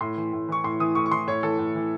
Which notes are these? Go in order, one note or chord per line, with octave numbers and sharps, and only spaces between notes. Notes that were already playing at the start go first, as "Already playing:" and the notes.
A2 C6
E3
A2
E3 C#6
A2 C6
E3 D#6
A2 C#6
C#6
E3 C6
A2 C#5
E3 A4
A2
E3